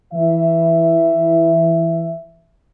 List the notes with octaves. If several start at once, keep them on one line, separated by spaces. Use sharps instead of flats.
E3 E5